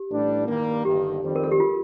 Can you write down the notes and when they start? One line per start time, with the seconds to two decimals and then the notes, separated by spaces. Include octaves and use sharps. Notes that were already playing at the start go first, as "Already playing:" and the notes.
Already playing: G4
0.09 A1 A2 G3 D4
0.46 G2 D#3 G3 A#3
0.85 G1 G2 D#3 G4
1.21 F2 D#3 G3 C4
1.36 A#4
1.44 A4
1.52 G4
1.60 F4